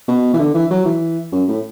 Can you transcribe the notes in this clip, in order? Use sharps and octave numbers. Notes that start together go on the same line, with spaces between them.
B2
E3
D3
E3
F#3
E3
F#2
A2